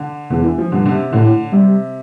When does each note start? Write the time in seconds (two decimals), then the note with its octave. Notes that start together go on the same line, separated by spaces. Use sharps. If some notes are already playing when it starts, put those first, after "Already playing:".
Already playing: D3
0.30 E2 D3
0.44 E3
0.58 F3
0.72 G2 D3
0.86 D3
0.91 C3
1.13 A2 D3
1.53 C3 G3